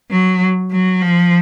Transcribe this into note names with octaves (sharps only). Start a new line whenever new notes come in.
F#3
F#3
F3